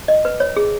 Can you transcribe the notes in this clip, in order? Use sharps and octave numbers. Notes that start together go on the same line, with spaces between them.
D#5
B4
C#5
G#4